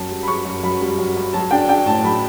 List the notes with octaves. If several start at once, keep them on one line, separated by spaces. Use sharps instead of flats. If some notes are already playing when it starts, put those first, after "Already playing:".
Already playing: F#2 A5
G3
B5
F#2 C#6
F#2
F#2 B5
G3
F#2
F#2
F#3 A5
D4 G5
D4 G5
A2 A5
F#3 B5